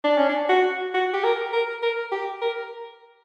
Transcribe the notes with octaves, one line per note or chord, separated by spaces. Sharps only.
D4
C#4
D4
F#4
F#4
G4
A#4
A#4
A#4
G4
A#4